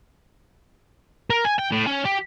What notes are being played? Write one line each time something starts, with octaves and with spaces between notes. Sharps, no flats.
A#4
G#5
G5
A2
C#4
G4